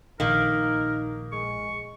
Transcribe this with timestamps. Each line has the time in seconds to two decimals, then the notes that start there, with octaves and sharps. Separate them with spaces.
0.20 A#1 D#3 A#3 D#4 A#4
1.32 G#3 C#6